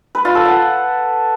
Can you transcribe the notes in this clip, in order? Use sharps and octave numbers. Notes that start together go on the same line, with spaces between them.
B4
F4
A4
F#5